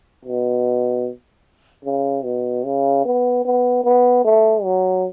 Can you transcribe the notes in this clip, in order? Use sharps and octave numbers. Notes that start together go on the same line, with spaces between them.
B2
C#3
B2
C#3
B3
B3
B3
A3
F#3